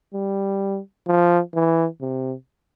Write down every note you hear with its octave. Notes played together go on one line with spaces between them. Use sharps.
G3
F3
E3
C3